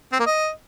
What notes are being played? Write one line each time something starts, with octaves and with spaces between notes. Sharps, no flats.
C4
A#3
D#5